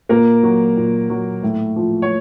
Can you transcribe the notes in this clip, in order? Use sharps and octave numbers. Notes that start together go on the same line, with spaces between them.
A#2 A#3 A#4
F#3
A#2
F#3
A2
F3
C#5